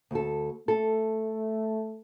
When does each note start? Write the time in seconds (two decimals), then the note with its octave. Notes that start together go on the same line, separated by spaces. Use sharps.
0.11 D2 A4
0.68 A3 A4